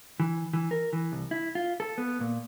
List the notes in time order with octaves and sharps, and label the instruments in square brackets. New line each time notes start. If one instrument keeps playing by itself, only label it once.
[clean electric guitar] E3
E3
A#4
E3
C2
E4
F4
A4
B3
A#2